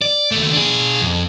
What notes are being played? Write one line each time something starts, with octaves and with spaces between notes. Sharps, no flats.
D5
D#2 A3
D4 G#4
F2